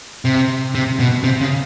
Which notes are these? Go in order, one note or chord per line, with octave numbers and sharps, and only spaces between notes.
C3
C3
B2
C3
C#3